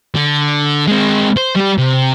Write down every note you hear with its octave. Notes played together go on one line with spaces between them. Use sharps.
D3
G#3 C4
C5
G3 G4
C3